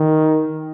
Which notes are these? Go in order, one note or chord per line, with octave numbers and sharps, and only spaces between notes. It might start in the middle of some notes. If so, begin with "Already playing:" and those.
Already playing: D#3